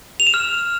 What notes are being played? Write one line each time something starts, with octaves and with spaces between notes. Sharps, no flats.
F7
E7
F6